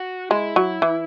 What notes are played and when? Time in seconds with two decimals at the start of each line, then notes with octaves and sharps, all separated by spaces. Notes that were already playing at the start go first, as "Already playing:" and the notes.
Already playing: F#4
0.31 G#3 E4
0.56 F#3
0.82 E3